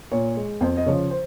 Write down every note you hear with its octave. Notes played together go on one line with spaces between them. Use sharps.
A#2 C#5
G#3
F2 C5
D#5
C#3 F3 C#5
C5